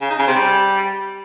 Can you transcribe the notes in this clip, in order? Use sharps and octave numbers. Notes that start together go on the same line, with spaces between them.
C#3
D#4
C#3
C3
G3